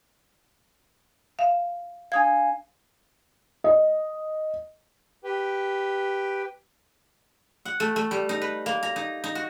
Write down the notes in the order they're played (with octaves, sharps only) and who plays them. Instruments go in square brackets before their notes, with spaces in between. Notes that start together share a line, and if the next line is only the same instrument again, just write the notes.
[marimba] E5 F5
[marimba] D4 D#6 G#6 [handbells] F5 G#5
[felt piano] D#5
[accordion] G4 B4 G5
[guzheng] F#5
A3
A3
G3
D#4
B4
A#3
A#5
D#4
D#4
F#4